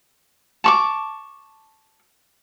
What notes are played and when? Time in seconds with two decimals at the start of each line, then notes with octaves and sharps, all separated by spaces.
0.64 A5 C#6 D6